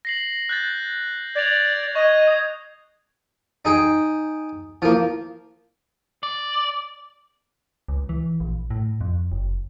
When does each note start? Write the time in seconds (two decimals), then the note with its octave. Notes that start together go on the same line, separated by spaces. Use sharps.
0.05 A#6 C7 F#7
0.49 F#6 G6 A6
1.35 D5 G#6 F7
1.95 D#5 C#6 G#6
2.28 D#6 G#6
3.65 D#4 G#4 G5
4.82 F3 A#3 E4 A#4
6.23 D5
7.88 C#2
8.09 E3
8.40 A#1
8.70 A2
9.01 F2
9.32 F#1